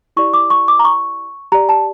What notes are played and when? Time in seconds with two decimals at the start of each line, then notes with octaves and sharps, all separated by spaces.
0.17 E4 G4 D5 C#6
0.34 D6
0.50 C#6
0.68 D6
0.79 A#5
0.85 C#6
1.52 G4 D5 A#5
1.69 A5